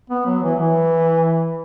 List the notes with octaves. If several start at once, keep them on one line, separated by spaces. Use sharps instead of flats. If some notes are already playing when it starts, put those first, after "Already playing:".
B3
F#3
E3
E3